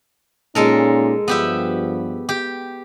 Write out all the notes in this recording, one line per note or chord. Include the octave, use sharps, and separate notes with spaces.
A#2 G#3 C#4 D#4 A4 A#4
G2 F3 B3 G4 E5
G4